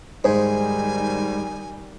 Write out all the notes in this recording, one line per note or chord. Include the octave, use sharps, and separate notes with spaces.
G#2 D#3 G3 C5 G#5